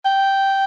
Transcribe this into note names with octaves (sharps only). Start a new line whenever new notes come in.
G5